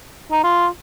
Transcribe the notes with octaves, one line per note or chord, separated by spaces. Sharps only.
D#4
F4